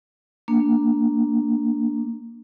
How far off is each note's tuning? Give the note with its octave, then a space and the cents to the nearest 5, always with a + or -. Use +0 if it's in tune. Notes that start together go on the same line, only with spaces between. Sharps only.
A#3 +0 D4 +0